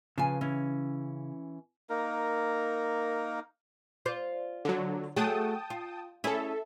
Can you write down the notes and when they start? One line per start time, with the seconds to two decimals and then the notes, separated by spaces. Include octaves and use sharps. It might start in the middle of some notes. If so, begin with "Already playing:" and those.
0.18 C#3 F3 B4 G#5
0.41 E3 C#4
1.90 A#3 D#4 A#4
4.06 F4 C5 D5
4.65 D3 F#3
5.16 F#3 A3 G#4 G5 A5 D#6
5.70 F4
6.24 C#4 E4 G#4 A4 E5